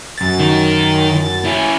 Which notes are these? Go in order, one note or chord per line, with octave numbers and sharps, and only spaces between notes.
F#2 A6
D#3
C#4 E4